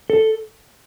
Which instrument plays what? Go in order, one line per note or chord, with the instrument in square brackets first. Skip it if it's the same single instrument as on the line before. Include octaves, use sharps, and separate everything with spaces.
[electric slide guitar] A4